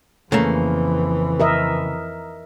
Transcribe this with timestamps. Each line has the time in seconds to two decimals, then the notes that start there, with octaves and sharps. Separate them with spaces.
0.32 F2 C#3 E3 A3 A#3
1.40 A#4 D#5 E5